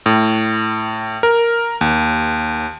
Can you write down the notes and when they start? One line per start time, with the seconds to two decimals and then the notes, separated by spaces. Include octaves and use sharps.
0.06 A2
1.23 A#4
1.81 D#2